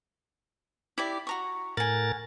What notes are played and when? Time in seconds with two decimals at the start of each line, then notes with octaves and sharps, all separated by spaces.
0.98 E4 G4 D5
1.27 F#4 A#5 C#6
1.77 A2 A#4 F#5 G#5 A6